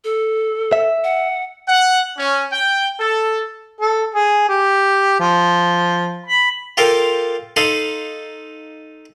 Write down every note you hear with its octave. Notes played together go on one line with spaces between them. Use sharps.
A4
E5
F#5
F#5
C#4
G5
A4
A4
G#4
G4
F3
B5
F4 G4 A4 A#4 C5 F5
D#4 A4 F5 B5 C6 D#6